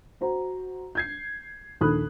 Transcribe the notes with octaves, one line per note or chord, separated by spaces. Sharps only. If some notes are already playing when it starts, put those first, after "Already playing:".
F#4 C5 A#5
G6 G#6 C7
A#1 D#2 A4 B5 D#6 F#6